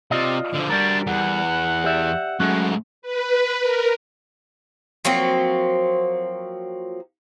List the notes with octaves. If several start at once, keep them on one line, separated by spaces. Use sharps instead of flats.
C3 F4 D5 D#5
D3 F3
G3 D4 F#4 A#4 A6
E2 F#5
G4 D5 E5
G#2 F#3 A3 C#4 F#4
B4
A#4
F3 F#3 A#3 C4